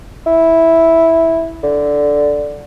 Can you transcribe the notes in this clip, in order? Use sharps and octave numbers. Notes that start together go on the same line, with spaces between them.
E4
D3